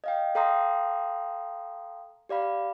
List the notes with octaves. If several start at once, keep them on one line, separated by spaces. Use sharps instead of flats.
D#5 F5 G5
A4 F5 G5 A#5 C6 D#6
G4 D5 F5 B5